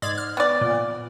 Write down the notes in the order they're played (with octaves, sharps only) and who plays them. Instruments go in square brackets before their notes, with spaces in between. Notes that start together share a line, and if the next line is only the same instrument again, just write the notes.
[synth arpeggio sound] G#2 D5 G#6
F6
[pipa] B3 D5
[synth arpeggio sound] A#2